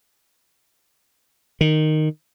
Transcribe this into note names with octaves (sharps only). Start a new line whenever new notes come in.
D#3